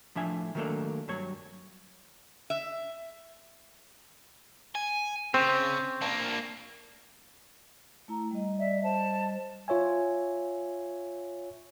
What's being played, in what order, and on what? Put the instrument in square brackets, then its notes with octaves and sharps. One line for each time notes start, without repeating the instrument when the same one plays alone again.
[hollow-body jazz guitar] A2 F3 D4 E5 G#5
D#3 F#3 G3 A3 A#3 D4
G2 F#3 C#5
[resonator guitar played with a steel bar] E5
[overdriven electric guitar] G#5
[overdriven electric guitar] C#3 [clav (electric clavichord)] C4
[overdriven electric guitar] A#3 D4
[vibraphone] A3 E4 A#5
G3 D#5
[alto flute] D5 [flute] E5
[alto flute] C5 [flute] A5
[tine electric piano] F4 C#5 E5 G#5